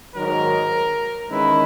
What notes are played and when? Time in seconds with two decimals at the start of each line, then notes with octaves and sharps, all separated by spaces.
0.15 G#2 D#3 F#3 A#4
1.30 E2 D#3 G#3 C#4 E4 B4